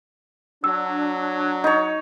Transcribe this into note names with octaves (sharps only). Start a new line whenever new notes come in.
F#3 D4 E6
D#4 C#5 D#5